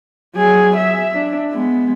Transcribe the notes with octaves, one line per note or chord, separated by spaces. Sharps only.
F#3 G#4
E5
D4
G#3 B3